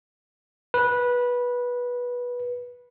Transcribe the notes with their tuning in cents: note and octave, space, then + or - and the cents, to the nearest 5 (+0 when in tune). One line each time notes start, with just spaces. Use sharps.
B4 -15